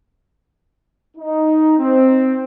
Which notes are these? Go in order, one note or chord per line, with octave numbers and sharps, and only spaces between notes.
D#4
C4